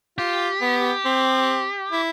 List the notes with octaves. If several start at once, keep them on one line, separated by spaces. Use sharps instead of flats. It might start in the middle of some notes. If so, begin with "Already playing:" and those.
F4 G4
B3
C4
E4